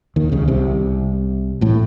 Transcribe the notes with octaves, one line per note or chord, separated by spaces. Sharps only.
D#2 D#3
C#2 C#3
C2 C3
A1 A2